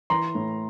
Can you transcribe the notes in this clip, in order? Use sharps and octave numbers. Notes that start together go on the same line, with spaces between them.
E3 A#5 C6
A2